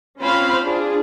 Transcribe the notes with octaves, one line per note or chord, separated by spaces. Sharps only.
C4 C#4 F4 C5 F5 B5
D4 F4 G#4